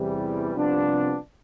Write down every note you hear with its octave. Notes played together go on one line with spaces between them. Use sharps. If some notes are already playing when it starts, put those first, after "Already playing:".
Already playing: E2 C3 E3 G3
C2 C3 F3 B3 D4